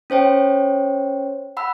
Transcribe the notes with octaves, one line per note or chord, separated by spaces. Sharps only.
C#4 C5 C#5 G5
F#5 B5 E6